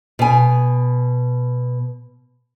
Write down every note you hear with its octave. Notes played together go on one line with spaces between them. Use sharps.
B2 G#5